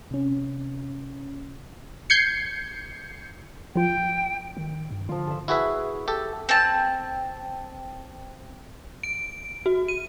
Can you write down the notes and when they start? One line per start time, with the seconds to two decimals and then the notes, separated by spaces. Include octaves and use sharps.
0.11 C3 C#4
2.10 G6 G#6 C7 C#7
3.76 F3 F4 G5
4.57 D#3
4.91 G2
5.09 D3 F3 F4
5.27 A4 E5
5.48 E4 F#4 G#4 B4 E5
6.08 G4 A4
6.49 C4 A5
9.03 D7
9.66 F#4
9.88 D#7